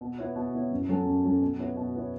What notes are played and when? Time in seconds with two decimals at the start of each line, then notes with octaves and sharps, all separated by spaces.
0.01 B2
0.18 B3 E4 C#5
0.35 B2
0.54 B3 E4 C#5
0.71 F#2
0.89 F#3 C#4 A4
1.06 F#2
1.24 F#3 C#4 A4
1.41 B2
1.59 B3 E4 C#5
1.76 B2
1.95 B3 E4 C#5